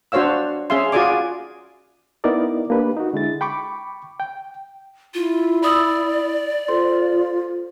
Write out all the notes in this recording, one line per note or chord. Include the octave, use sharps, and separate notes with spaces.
D4 F#4 C5 C#5 F5 E6
C#4 G#4 E5 F5 C6
F4 F#4 G#4 D5 G#5 D6
B3 D#4 E4 A#4 D5 D#5
A#3 D4 G4 B4
D#4 F#4
D3 G#3 E4 A6
G5 B5 C#6 D6
G5
E4 F4
D5 B5 D#6 E6
F4 A4 C5 C6